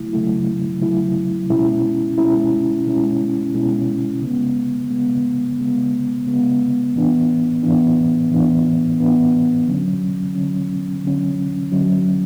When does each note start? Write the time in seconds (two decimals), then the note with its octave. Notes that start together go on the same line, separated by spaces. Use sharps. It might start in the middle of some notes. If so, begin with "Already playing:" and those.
Already playing: C#3 F#3 A3 E4
0.13 C#3 F#3 A3 E4
0.82 C#3 F#3 A3 E4
1.50 B2 G#3 C#4 E4
2.18 B2 G#3 C#4 E4
2.87 B2 G#3 C#4 E4
3.54 B2 G#3 C#4 E4
4.22 C#3 G#3 B3
4.90 C#3 G#3 B3
5.59 C#3 G#3 B3
6.27 C#3 G#3 B3
6.95 A2 E3 B3 D4
7.63 A2 E3 B3 D4
8.30 A2 E3 B3 D4
8.99 A2 E3 B3 D4
9.67 D3 F#3 C#4
10.35 D3 F#3 C#4
11.03 D3 F#3 C#4
11.72 D3 F#3 C#4